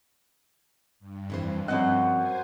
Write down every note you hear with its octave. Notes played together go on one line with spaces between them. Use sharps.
G2
F2 E3 C5
F#2 F3 C4 D#5 F#5
C5 G#5